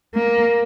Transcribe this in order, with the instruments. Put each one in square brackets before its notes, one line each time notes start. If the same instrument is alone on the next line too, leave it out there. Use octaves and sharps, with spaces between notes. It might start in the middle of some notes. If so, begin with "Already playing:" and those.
[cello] A#3